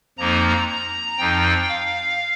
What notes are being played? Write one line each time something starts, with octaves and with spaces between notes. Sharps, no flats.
F2 F3 A#3 D#4 A#5
A#5
F2 F3 D#4 G5
F5